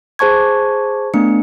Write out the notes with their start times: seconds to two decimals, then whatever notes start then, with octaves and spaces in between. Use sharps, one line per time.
0.19 G#4 C5 A5 C#6 G#6
1.14 A3 B3 D4 C#7